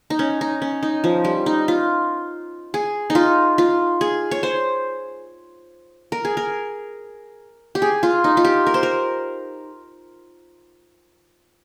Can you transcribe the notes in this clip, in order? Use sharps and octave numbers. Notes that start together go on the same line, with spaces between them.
D#4
C#4
D#4
C#4
D#4
F3
G3
D#4
F4
G#4
D#4
F4
F4
G#4
C#5
C5
A#4
G#4
A#4
G4
G#4
F4
D#4
F4
G4
A#4
C5
A#4